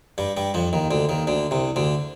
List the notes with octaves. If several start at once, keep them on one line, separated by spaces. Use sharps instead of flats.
G2 G3
G2 G3
F2 F3
D#2 D#3
D2 D3
D#2 D#3
D2 D3
C2 C3
D2 D3